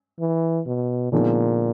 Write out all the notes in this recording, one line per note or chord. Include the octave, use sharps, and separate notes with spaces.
E3
B2
A#2 D3 F3 G#3 B3 D#4